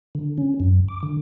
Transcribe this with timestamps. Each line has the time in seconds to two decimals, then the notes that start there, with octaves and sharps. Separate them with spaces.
0.15 D3
0.38 C#4
0.60 F#2
0.88 D6
1.03 D3